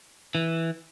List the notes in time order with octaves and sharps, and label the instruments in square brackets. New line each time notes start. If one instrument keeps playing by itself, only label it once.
[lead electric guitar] E3